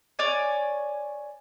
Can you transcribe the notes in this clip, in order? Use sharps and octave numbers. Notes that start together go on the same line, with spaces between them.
C#5 D5 G#5